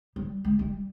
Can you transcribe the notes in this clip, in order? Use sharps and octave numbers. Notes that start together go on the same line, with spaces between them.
G3
G#3
G3